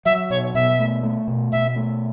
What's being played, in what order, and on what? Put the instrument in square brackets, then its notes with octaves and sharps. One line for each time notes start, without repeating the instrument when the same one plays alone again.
[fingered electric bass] F#3 [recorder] E5
[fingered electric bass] B2 [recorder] C#5
[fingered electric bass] B2 [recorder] E5
[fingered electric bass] A3
A3
B2
[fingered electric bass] B2 [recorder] E5
[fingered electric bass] A3